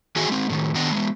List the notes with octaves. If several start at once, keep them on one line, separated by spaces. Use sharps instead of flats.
D#3 F#4 G#4 D#5 E5 G#5
G#3 C4
A2 D#3
D#3 B3 D4 D#5 G5
G#3 B3